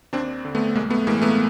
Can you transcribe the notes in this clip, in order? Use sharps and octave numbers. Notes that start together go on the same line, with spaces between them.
D#2 C4 D4
D3
A3 B3
B1 G#3 A#3
A3 B3
A2 E3 G#3 A#3
A3 B3